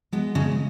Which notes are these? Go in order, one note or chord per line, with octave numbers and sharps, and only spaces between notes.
G#3 B3
C#3 G#3 C#4